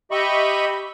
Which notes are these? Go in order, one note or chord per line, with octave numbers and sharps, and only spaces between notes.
G4 D#5 E5 B5 C#6